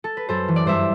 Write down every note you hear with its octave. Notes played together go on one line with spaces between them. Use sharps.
A4
B4
F#2 A4 C5
E3
D5
G2 C5 E5